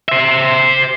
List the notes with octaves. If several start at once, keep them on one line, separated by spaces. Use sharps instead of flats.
C5 E5